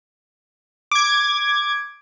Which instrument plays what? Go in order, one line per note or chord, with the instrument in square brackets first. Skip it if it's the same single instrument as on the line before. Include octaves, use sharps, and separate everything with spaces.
[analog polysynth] D6 G#6